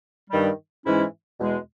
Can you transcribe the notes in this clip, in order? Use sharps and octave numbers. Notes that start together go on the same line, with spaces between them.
G2 D#3 G3
G#2 E3 G#3 C#4 E4
E2 B2 G#3